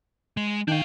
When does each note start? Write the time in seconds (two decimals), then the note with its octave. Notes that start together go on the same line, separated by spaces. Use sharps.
0.37 G#3
0.68 D#3 D4 F5 G5